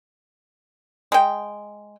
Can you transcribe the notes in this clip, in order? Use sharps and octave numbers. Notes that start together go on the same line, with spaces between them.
G#3 G5